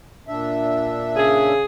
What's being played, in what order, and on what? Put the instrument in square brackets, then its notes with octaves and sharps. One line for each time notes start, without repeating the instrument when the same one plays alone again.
[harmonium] A#2 D4 E5
[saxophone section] C#3 G#4